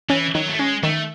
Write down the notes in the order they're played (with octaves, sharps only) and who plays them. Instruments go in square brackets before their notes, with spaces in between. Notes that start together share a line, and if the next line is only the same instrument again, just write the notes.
[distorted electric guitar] E3 [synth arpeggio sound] C#4
[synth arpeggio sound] D#3 [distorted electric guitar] F#3
[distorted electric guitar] A3
[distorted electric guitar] G#3 [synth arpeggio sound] C#4
[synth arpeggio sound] D#3 [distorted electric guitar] A3